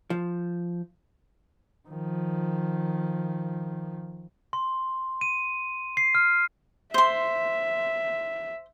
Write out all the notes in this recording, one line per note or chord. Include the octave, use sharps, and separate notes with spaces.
F3
D#3 F3
C6
D#7
C7
F6
C5 E5 C6